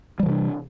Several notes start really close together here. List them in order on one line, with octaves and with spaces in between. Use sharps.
G3 E3 C3 D4